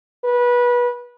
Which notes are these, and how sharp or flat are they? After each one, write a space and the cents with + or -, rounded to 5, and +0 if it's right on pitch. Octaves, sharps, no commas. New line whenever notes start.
B4 -25